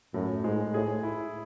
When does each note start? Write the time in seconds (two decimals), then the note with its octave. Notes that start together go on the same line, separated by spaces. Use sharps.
0.14 F#2 A2
0.44 G#2 G#3
0.74 A2 G#4
1.03 E4